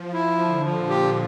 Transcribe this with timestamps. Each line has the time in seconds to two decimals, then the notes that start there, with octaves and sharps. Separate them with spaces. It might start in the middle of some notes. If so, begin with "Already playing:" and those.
Already playing: F3
0.13 E4
0.39 D3 F3
0.64 F3
0.76 A#2
0.89 G4